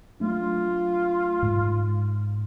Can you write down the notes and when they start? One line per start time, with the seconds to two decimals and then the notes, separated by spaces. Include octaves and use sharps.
0.20 F#3 A3 D4 F4
1.42 G#2